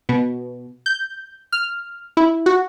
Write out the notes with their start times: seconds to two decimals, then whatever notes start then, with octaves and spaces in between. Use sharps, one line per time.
0.09 B2
0.86 G6
1.52 F6
2.17 E4
2.46 F#4